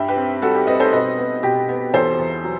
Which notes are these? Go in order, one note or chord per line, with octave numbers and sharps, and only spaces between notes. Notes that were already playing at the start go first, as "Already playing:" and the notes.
Already playing: G2 E5 G5
G4 B4
C4
G3 F#4 A4
G4
C4 B4 D#5
A4 C5
B2 B4 D#5
B3
B2 G4
B3
E2 A4 C5
E2
F#3